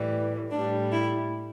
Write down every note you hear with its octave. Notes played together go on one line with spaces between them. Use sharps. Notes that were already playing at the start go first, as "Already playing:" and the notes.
Already playing: A2 E3 G3
A2 G3 D4
E4